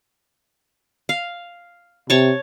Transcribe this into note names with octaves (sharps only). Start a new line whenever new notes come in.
F5
C3 C#5 A5 C#6